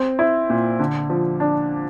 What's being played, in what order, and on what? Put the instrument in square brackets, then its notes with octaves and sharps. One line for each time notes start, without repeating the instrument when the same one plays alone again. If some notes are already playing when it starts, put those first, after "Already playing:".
Already playing: [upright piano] C4
E4
A#2
D3
F3
D4